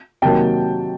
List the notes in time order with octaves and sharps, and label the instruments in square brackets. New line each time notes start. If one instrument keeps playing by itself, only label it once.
[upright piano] C3 D#3 F#3 A#3 G5 A5